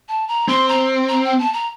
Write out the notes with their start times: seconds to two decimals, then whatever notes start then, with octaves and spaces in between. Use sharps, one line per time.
0.09 A5
0.28 A#5
0.48 C4 C6
0.69 A#5
1.09 A#5
1.24 G5
1.39 A5
1.53 A#5